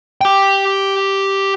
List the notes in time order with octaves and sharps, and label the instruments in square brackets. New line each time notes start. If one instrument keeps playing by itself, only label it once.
[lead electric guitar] G4 G5